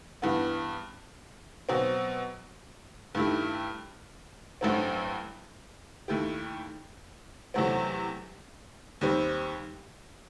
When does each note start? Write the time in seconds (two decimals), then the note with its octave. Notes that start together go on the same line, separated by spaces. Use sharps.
0.22 G2 E3 B3
1.69 B2 F#3 C4
3.15 G2 D#3 A3 E4 G4
4.61 A1 G2 F#3 A3 C4
6.08 D#2 D#3 A3 E4 G4
7.54 E2 C3 F#3 A3 C4
9.01 D#2 D#3 G3 C4